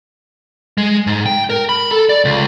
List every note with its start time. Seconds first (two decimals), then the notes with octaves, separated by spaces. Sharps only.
0.78 G#3
1.07 G#2
1.26 G5
1.50 A#4
1.69 B5
1.91 A4
2.09 D5
2.25 C#2